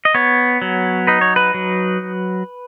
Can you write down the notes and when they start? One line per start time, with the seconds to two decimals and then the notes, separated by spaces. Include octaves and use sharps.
0.05 D#5
0.14 B3 C#5
0.62 F#3
1.07 D#4 B4
1.21 C#5
1.36 B4
1.54 F#3